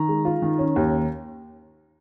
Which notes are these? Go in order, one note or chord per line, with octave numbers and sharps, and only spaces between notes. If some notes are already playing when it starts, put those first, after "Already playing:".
Already playing: D#3 A#5
G#3
F4
D#3
C#4
D#2